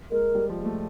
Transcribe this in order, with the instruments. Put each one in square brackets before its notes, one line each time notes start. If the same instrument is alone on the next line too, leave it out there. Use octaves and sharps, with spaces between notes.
[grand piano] G#3 [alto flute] A#4
[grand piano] G3
F3
G#3
A3